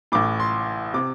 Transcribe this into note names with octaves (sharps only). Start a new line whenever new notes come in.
A1 A2 D6
C6
C3 D6